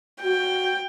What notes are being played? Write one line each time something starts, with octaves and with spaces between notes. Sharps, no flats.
F#4 G5